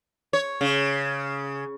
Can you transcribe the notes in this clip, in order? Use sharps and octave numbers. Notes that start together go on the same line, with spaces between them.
C#5
C#3